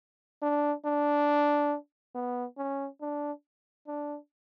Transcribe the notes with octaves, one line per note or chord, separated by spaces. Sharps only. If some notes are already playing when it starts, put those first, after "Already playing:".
D4
D4
B3
C#4
D4
D4